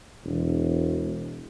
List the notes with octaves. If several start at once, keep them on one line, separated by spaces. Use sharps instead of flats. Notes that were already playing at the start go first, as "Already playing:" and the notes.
E1